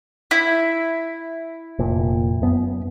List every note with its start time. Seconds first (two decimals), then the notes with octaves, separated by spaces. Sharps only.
0.31 E4
1.79 F1 A#2
2.42 F#2 B3